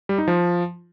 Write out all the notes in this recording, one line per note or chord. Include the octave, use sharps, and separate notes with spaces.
G3
D#4
F3